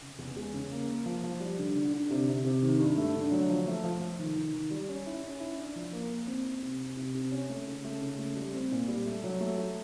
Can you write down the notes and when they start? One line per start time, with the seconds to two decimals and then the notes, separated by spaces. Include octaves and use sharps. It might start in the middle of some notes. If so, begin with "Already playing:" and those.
0.02 C#3
0.19 E2
0.36 G#3
0.54 C#3
0.72 A#3
0.88 A#3
1.06 F3
1.23 F3
1.40 G3
1.59 D3
1.75 D3
1.93 D3
2.11 C3
2.28 C3
2.44 C3
2.62 D#3
2.80 G2
2.97 A3
3.15 D3
3.32 F#3
3.49 F3
3.67 A3
3.84 F3
4.01 F3
4.19 D#3
4.36 D#3
4.54 D#3
4.71 G3
4.89 C#4
5.06 E4
5.24 C#4
5.40 E4
5.58 D4
5.76 F3
5.92 A#3
6.10 A#3
6.27 C4
6.45 C4
6.62 C3
6.80 C4
6.97 C3
7.15 C3
7.31 C#4
7.49 A3
7.67 C#3
7.84 A3
8.01 C#3
8.19 A3
8.36 G3
8.54 C4
8.71 A#2
8.88 G3
9.06 A3
9.24 F#3
9.41 A3
9.58 A3